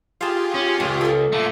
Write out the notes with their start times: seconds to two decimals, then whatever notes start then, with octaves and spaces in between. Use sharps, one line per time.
0.21 F4 G4 G#4 F5 A5
0.54 C#4
0.80 C#2 G#3
1.01 A4 A#4
1.33 A#2 A3 C#7